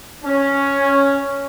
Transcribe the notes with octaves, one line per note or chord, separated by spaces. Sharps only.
C#4